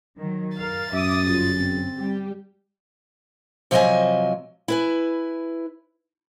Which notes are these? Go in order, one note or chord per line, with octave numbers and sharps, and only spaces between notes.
D#3 F#3
A#4 F5 A6
F#2 E5 D6 D#6
G1 C#3 F4
C4
G3 G4
C3 F3 F#3 C#5 D#5 G#5
E4 B4 G#5